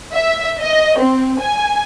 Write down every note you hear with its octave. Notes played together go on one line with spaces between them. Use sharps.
E5
D#5
C4
G#5